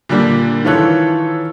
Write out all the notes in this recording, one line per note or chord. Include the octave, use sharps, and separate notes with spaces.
A#2 D3 G3 D4
D#3 E3 F4 A4 C#5 F#6